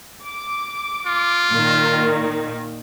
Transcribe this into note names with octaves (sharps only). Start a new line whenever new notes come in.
D6
F4
A#2 D#3